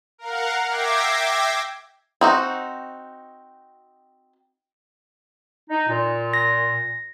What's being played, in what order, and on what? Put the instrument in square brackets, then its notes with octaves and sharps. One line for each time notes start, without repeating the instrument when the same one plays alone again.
[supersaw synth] A#4 F5 F#5
E5 G5 D6 G#6 A#6 C7
[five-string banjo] C4 D#4 F#4
[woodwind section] D#4
A#2
[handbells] A#6